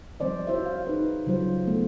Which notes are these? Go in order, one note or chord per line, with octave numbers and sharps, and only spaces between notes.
F3 G3 C4 C5 D5 D#5
E4 F#4 C5 C#5 E5
F5
D#4 G#4 B4
C#3 F#3 G3 F4 C5
A3 B3